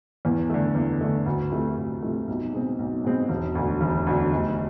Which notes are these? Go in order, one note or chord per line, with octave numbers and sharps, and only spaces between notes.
E2
D3 A3
E2
D3 A3
D2
C3 F3 A3
D2
C3 F3 A3
B1
B2 G#3 C4
B1
B2 G#3 C4
E1
D2 D3
E1
D2 D3
F1